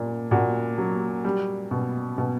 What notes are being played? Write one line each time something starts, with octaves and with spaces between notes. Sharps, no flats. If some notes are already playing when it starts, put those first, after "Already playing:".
Already playing: A#2
A#2 F#4
F#3
G3
B2
B2